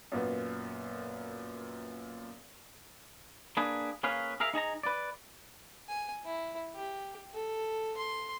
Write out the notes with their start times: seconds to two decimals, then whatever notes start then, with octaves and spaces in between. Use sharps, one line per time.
0.12 F#2 A#2 B3
3.57 A#3 D4 G#4 B4
4.03 A#3 C#4 G#4 B4 F5
4.40 G#4 A#4 E5 F5
4.54 D#4 G#4 A5 A#5
4.83 B4 D5
5.89 G#5
6.25 E4
6.75 G4
7.34 A4
7.97 C6